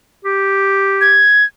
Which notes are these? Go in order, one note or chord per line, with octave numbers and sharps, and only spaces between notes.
G4
G#6